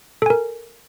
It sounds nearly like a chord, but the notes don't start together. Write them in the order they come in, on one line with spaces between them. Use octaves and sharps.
A4 G#5 A#4